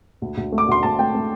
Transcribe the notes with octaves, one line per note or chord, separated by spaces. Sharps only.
D2
D2
A3
D6
D2 C6
D2 A5
A3 G5
A3